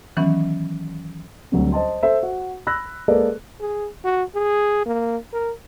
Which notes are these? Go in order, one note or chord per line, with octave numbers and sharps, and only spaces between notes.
D#3 E3 F#3 B3 C#4
D2 F#3 G3 C4
C5 D#5 A5 C6
A4 C5 E5
F#4
B5 E6 F#6 A#6
G#3 A#3 G#4 A4 B4 D5
G#4
F#4
G#4
A#3
A#4